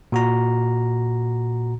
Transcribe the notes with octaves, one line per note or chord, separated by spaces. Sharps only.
A#2 F#4 A#5